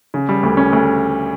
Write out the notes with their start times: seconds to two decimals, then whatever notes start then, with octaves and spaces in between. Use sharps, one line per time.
0.14 C#3
0.29 G3
0.43 D2
0.57 C#4
0.73 D2